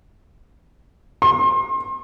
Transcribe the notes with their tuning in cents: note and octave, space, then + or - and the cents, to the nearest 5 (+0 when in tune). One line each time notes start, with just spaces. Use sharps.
C6 +30